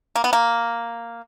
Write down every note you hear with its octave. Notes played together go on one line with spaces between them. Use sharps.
A#3
B3
A#3